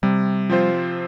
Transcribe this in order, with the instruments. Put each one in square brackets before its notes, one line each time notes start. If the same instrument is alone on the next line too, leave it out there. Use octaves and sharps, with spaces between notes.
[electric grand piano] C3 [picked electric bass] G3
[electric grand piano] F3 C4 F4 C5